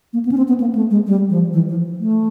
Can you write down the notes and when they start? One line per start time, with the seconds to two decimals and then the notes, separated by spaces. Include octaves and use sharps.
0.13 A#3
0.25 B3
0.32 C#4
0.37 C4
0.48 B3
0.60 A#3
0.75 A3
0.91 G#3
1.07 G3
1.30 F3
1.53 E3
1.69 F3
2.00 A3